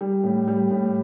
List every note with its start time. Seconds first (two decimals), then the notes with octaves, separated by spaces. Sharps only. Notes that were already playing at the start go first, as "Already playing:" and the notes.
0.01 G3
0.24 A2
0.48 G3
0.71 A2